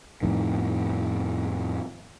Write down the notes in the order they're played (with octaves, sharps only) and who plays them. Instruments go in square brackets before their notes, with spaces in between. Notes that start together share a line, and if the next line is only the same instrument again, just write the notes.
[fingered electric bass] F2 A2 D#3